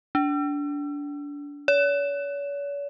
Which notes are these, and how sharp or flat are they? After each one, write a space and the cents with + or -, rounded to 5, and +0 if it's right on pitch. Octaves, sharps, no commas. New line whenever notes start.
D4 -25
C#5 +45